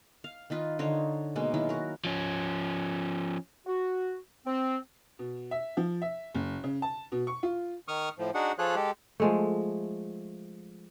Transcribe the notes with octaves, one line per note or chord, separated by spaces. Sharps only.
F5
D#3 D#4 F4 B4
D3 D#4 C5 C#5
B2 G#3 A#3
D#3 F#3 G#3 E4
F#4 A#4
F3 C#4
F#4
C4
B2
E5
F3
E5
F#1
C#3
A5
B2
C#6
F4
D#3 C#6 D#6 F6
A2 F3
D4 D#4 F#4 G#4 F#5
F3 F4 G#4 A4 C#5 F#6
G#3 G4 A4
F3 G#3 A3